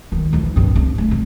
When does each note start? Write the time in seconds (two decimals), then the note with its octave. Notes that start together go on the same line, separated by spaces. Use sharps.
0.12 D#3 G3
0.33 E2 F3
0.56 C2 G2
0.75 C4
0.98 C#3 A3
1.11 F2